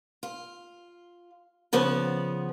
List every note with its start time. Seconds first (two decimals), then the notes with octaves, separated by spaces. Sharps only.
0.23 F4
1.73 C#3 F3 B3